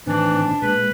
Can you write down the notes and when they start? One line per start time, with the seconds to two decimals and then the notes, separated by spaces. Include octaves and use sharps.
0.07 A2 D#3 E3 C4 D4
0.62 A#2 G#3 B4